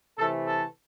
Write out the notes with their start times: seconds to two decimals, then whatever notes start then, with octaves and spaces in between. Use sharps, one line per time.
0.18 C3 E3 A3 A4
0.46 A4